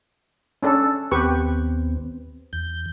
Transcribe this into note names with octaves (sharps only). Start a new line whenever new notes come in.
C#4 D4 A4
D#2 B3 C4 G4 B4 C#6
E2 G6